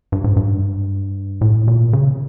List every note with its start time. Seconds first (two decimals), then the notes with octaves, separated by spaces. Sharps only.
0.12 G2
0.24 G#2
0.36 G2
1.41 A2
1.68 A#2
1.93 C#3